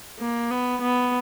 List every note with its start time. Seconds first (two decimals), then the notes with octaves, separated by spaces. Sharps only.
0.19 A#3
0.51 B3
0.81 B3